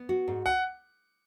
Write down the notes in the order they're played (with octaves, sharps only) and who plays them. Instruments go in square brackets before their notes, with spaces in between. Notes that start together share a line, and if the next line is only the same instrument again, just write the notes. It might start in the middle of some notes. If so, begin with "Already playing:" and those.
Already playing: [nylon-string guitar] B3
F#4
G#2
[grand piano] F#5